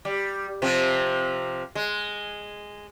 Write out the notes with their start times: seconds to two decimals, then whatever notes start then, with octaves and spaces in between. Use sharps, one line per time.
0.05 G3
0.62 C3 F3 C4
1.75 G#3